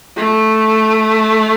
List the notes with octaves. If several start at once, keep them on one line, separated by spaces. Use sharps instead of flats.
A3